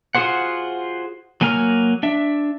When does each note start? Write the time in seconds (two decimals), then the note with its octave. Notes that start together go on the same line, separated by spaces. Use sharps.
0.15 F4 F#4 G#4 C5 F#5
1.41 F#3 A#3 G#5 A#5 F6
2.03 D4 E5